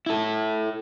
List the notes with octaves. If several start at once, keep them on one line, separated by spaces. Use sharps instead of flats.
E4 A4